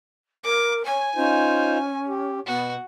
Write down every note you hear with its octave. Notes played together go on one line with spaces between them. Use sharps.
A#4 D6
C#5 G#5
C#4 D#4 F4 C5
G4
B2 B3 F#4